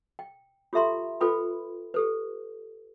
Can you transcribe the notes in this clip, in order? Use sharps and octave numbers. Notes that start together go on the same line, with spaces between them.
G5
F4 G4 A4 E5 A#5 C6
F4 A4 B4 G5 B5
G4 A4 B4